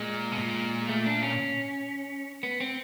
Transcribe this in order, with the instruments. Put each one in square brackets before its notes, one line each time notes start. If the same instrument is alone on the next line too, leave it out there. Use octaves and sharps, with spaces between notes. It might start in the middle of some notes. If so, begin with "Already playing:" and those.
Already playing: [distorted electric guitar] A#2 [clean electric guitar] G#3
[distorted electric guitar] B2
A#2
[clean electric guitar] A3
D4
C#4
B3
C4